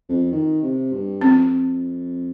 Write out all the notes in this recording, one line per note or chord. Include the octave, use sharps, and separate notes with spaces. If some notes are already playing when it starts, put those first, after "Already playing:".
F2
D#3
C3
G2
F2 C4